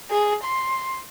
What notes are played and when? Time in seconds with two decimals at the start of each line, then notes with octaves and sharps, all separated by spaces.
0.11 G#4
0.44 C6